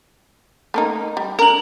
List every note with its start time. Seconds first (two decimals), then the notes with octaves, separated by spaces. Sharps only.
0.74 A3 A#3 D#4
1.17 G3
1.39 D4 A#4 A#5 F#7